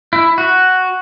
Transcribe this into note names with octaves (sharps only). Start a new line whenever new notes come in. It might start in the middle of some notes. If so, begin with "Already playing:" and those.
E4
F#4